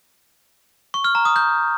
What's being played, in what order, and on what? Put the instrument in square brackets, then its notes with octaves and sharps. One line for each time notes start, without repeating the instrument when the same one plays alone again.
[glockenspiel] C#6
F6
A#5
D#6
G6